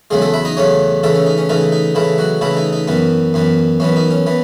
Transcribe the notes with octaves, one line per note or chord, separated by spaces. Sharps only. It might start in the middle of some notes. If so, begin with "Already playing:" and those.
E2 C#3 F#3 G#3 A3 G#4
A3 A4
E4 E5
D#4 D#5
E2 C#3 F#3 A3 C#4 C#5
C#3 E3 A3 A4
C#4
D#4
C#4
C#3 E3 A3 D#4
D#4
C#3 E3 A3 E4
F#3 F#4
C#3 E3 A3 E4
D#4
D#4
F#2 E3 B3
F#2 E3 B3
F#2 E3 B3 C#4
D#4
C#4
E3 B3